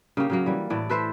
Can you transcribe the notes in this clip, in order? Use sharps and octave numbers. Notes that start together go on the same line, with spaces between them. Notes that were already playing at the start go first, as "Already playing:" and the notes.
C#3 A#3 G4
C#3 F#3 A#3
E3 G3
A2 E3 D5
A4 B4 C5 E5